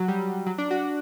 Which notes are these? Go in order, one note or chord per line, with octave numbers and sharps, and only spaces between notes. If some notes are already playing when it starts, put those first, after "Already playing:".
Already playing: F#3
G3
F#3
D4
F#4